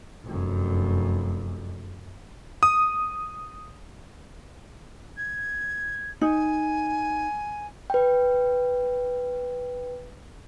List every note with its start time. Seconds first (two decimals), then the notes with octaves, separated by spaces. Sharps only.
0.24 F1 F#2
2.63 D#6
5.17 G#6
6.21 D#4 G#5
7.90 B4 G5